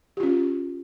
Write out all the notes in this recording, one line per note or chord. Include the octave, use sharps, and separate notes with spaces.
C#4 F4 G4